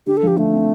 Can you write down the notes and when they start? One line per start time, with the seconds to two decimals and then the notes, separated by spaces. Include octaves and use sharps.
0.07 D3 G4
0.17 A4
0.23 F3 G4
0.38 D3 A3
0.53 C4